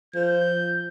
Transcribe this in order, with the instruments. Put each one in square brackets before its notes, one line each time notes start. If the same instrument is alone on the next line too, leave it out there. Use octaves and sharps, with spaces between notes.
[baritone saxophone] F3 [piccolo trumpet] G6